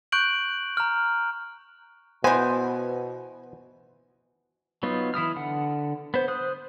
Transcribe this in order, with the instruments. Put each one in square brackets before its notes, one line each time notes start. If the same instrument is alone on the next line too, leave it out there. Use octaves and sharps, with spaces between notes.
[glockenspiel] C#6 F#6 G6 D7 F#7
A#5 F6
[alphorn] B2 [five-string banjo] E3 G#5 [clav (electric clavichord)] B3 [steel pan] C5
[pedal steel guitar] F#3 B3 D#4 F4
E3 E4 D#6 F6
D3 F#5
B3 C5
C5 D#6 F#6